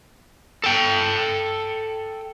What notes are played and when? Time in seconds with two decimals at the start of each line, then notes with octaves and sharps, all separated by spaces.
0.64 A4 G5